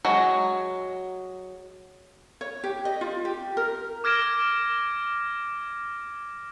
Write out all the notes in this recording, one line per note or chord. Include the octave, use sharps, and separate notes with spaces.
F#3 G#3
C#5
G4
D#5
F4
G4
A#4
D6 F6 G#6 A#6 D7 E7